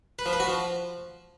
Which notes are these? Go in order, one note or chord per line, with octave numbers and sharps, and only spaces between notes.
B4
F3
B4
F#4
F3